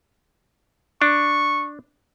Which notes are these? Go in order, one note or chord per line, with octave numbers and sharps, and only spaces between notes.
D4 C#6